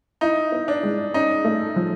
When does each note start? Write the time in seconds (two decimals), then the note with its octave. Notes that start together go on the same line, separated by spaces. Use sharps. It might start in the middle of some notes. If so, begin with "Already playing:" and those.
0.21 D#4 E4
0.52 B3
0.68 D4
0.83 G#3
1.14 C#4 D#4
1.44 A3
1.76 F3